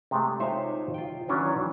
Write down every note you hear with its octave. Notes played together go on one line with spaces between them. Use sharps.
C3 G#3 A3
D#4 F4 C5 C#5 E5 F5
F4 G5
D#3 E3 F#3 C#4 D4